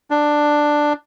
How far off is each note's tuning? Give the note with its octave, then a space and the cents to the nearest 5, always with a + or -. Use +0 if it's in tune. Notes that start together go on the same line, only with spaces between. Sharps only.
D4 +10